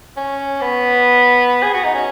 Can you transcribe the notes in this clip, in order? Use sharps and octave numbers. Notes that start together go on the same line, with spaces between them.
C#4
B3
G#4
F#4
D#4
C#4